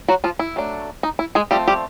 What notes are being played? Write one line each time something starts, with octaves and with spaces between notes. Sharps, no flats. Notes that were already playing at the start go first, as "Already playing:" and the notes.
F#3 F#4
F3 F4
E4
F#3 A3 D4
D#4
E4
G#3 G#4
F3 G3 A3 C4 G4
G3 G4